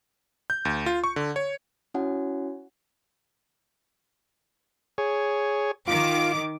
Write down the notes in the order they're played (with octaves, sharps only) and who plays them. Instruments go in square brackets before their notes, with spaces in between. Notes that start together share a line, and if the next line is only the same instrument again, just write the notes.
[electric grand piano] G6
D2
F4
C#6
D3
C#5
[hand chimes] C#4 E4 F#4 C#5 F#5 G#5
[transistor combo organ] G#4 C#5
[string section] D#3 D6 [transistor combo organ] F4